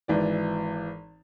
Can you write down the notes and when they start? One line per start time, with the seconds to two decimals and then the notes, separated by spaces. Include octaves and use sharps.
0.08 G#1 E3 D5